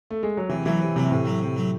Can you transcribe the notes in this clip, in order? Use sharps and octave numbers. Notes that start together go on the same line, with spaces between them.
A3
G#3
F#3
C3 E3
E3 F#3 A3
C3
C3 F#3 A3
A2 C3
F#3 A3
C3
F#3 A3